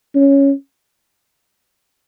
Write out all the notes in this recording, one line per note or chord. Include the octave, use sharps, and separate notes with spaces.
C#4